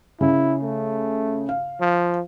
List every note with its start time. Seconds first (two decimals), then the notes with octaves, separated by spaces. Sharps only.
0.21 C#3 E4
0.62 A3
1.49 F5
1.80 F3